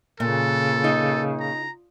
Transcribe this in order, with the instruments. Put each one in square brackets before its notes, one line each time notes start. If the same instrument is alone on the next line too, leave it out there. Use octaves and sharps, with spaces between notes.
[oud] A#2 [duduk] C#3 [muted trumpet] A4
[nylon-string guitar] D#4
[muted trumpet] A#5